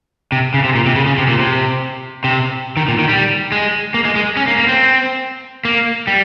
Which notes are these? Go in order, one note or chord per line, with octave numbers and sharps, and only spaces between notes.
C3
C#3
C3
A#2
C3
C#3
C#3
C3
A#2
C3
C3
D#3
A#2
D#3
G3
G#3
A#3
G#3
G#3
C#4
A#3
A#3
C4
A#3
G3